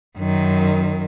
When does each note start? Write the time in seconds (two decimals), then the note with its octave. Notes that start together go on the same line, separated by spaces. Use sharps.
0.18 F#2 D#3